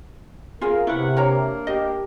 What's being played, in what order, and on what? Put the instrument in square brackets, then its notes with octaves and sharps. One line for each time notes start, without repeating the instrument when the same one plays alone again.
[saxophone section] C#3 [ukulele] F4 G#4 F5 [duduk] A#4
[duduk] C3 [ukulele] E4 B4 [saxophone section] A#4 C#5 F#5
[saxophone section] A#3 D4 [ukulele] A#4 C#5 A#5
[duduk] G4 [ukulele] D#5